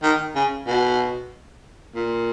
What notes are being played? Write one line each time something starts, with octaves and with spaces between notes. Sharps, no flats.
D#3
C#3
B2
A#2